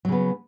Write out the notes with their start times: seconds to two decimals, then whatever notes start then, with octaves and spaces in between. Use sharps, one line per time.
0.05 F#3
0.08 C#3
0.12 B3